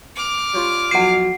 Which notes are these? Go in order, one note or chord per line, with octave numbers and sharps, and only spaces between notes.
D6 F6
G3 C#4 F4
B1 F2 B2 F#5 C7